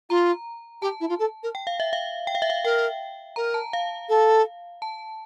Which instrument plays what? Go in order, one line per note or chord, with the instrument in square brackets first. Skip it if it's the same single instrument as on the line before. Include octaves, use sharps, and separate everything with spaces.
[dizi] F4 [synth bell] A#5
[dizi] G4 [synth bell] A5
[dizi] E4
F4
A4
A#4
[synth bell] G5
F5
E5
F5
G5
F5
E5
F5
[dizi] A#4 [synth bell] G5
[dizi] A#4 [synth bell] A#5
[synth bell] A5
F5
[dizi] A4
[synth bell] A5